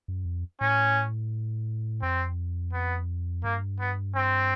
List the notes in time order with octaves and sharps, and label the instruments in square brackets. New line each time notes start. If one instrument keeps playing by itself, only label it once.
[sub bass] F#2
F2
[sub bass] A2 [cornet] C#4
[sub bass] F2 [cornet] C4
[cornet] B3
[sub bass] G2 [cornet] A#3
[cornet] B3
C4